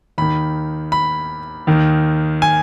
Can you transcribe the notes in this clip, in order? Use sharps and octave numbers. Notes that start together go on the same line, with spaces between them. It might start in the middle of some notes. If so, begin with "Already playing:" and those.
D#2 D#3 B5
B5
D#2 D#3
G#5